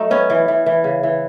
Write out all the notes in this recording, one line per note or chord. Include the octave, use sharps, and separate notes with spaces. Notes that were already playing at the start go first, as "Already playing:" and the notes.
Already playing: F#3 A3 D#4
B3 C#4
E3
E3
E3
C#3
E3